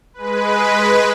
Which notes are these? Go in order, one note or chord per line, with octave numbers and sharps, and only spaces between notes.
G#3 B4